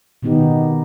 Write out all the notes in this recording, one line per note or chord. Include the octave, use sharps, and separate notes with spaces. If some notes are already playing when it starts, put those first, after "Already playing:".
B2 D#3 B3 D#4 G4